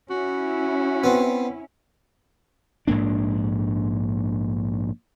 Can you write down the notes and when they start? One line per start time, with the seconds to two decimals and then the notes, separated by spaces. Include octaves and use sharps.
0.10 C#4 E4 F#4
1.04 B3 C4
2.87 A#1 G#2 A#3 D4